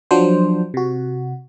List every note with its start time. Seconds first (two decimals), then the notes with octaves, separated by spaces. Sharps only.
0.11 F3 F#3 D4 C5
0.74 C3 F#4